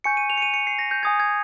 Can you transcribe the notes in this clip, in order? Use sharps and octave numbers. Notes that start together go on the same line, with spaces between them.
G#5 C#6 G6 C#7
D#7
F7
C#7
D#7
C#7
C7
A#6
G6
G#5 D#6 G6 G#6
G#6